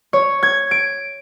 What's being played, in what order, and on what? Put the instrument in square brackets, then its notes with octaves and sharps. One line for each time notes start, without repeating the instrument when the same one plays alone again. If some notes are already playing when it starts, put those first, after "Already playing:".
[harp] C#5
G#6
D7